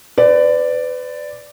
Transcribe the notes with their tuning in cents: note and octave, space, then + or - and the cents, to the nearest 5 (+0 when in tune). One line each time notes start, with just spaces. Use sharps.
B4 +35 D5 +0